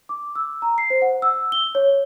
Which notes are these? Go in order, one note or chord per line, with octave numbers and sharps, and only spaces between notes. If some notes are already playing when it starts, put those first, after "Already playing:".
D6
E6
A#5
C7
C5
F#5
E6
G7
C#5